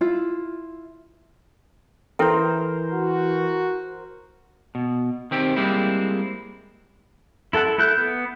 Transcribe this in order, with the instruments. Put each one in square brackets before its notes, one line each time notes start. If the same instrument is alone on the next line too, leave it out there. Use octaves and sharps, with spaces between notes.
[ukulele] E4 F4
[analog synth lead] E3 [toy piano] E4 A4 G5 [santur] A#4 C5
[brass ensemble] F#4
[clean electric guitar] B2
D#3 C4 G4
G3 G#3 A#3 C4 E4
[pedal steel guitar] E4 A4 F#5 A5
E4 A4 F#6 G6
B3